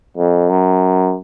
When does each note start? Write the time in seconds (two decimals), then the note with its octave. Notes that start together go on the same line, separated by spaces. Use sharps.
0.17 F2
0.49 F#2